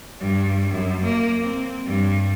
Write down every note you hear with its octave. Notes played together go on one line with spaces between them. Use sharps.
G2
F#2
A#3
C4
G2